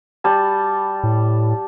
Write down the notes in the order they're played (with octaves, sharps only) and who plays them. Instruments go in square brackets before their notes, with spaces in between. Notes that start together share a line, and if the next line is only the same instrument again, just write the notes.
[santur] G3 A5
[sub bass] A2